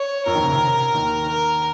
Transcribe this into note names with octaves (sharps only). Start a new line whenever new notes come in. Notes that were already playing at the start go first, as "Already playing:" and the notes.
Already playing: C#5
F2 F3 A#4
D#2 D#3
C#3
C3
D#2 D#3
A#4